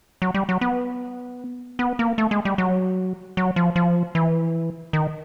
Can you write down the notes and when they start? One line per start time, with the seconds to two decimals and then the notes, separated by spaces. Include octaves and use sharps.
0.22 F#3
0.34 G3
0.49 F#3
0.61 B3
1.79 B3
1.99 A#3
2.18 A3
2.31 G#3
2.45 G3
2.58 F#3
3.37 F#3
3.56 F3
3.76 F3
4.15 E3
4.93 D#3